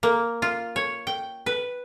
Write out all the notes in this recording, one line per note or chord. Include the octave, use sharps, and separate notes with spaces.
A#3
F4
C#5
G5
B4